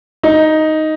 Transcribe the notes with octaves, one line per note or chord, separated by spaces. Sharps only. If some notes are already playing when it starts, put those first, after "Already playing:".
D#4